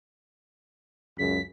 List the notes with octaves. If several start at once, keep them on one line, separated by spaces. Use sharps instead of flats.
C#2 F#2 C#3 B6